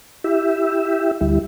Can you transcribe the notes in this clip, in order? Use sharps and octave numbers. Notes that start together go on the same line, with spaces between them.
E4 G4 E5
D2 G3 E4